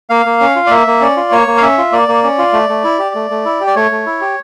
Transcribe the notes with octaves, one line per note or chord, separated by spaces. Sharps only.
A#3 F5
A#3
C#4
F4
D5
A#3 E5
A#3
C#4 D5
F4
A#3 C#5
A#3
F5
C#4 E5
F4
A#3 D5
A#3
C#4
F4
A3
A3
E4
G4
A3
A3
E4
G4
D5
A3 C#5
A3
E4
G4